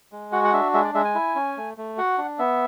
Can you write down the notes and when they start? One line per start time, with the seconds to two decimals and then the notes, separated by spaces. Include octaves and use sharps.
0.12 G#3
0.32 F#4 F#5
0.44 F#5
0.53 D4 E5
0.74 G#3 E5
0.84 D5
0.95 G#3 E5
1.05 G#5
1.15 E4
1.35 C#4
1.57 A3
1.77 A3
1.98 F#4 F#5
2.18 D4
2.39 B3 E5